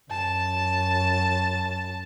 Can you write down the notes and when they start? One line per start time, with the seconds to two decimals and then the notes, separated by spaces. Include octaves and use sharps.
0.11 F#2 A5